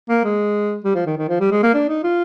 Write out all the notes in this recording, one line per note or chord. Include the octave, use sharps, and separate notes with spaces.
A#3
G#3
G3
F3
D#3
D#3
F3
G3
G#3
A#3
D4
D#4
F4